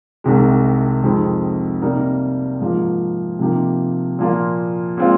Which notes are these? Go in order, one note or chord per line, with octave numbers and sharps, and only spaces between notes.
C2 C3 D#3 G#3
F2 D#3 G#3 C4
C3 G3 A#3 D#4 A#4
G#2 F3 A#3 F4
C3 F3 A#3 D#4 G4
A#2 F3 A#3 F4
A#2 G#3 C4 F4